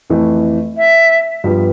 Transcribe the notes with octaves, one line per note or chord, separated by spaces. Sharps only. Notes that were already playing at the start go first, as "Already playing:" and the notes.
F2 E3 A3
E5
G2 F3 B3